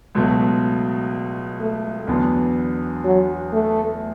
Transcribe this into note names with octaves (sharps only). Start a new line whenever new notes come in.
C#2 B2 F#3 A3
A3
E2 D3 F#3 B3 D4
F#3
A3